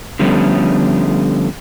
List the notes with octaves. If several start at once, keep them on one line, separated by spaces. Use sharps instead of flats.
D3 F3 G3 A3 B3 C#4